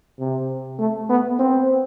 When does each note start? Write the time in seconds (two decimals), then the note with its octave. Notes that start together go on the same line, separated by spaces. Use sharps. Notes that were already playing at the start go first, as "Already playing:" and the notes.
0.19 C3
0.79 A3
1.10 B3
1.39 C4